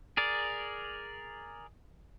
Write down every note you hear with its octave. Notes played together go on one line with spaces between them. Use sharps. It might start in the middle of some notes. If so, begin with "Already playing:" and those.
G#4 A#4 D5